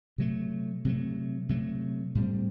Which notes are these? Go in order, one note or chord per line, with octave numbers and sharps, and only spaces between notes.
C3 F#3 A3
C3 F#3 A3
C3 F#3 A3
A2 G3 C4